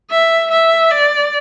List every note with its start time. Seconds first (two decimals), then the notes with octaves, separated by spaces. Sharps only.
0.11 E5
0.51 E5
0.91 D5